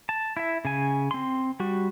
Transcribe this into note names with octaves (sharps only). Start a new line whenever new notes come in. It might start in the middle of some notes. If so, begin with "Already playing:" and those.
A5
E4 E5
C#3 G#5
C4 C6
G3 F#4